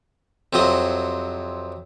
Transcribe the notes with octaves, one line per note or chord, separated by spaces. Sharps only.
F2 C3 F#3 D#5